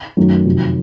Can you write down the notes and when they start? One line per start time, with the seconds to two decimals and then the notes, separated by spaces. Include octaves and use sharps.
0.17 F#2 D#3 F#3 A3 C#4
0.45 F2 C3 D#3 F#3